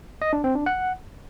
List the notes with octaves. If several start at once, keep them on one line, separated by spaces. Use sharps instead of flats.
D#5
D4
C4
D4
F#5